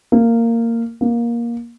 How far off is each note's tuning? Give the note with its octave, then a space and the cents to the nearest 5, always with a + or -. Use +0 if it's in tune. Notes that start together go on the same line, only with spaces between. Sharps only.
A#3 -15
A#3 +15